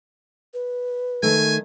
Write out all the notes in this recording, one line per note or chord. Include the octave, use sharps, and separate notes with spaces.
B4
D#3 A3 G#5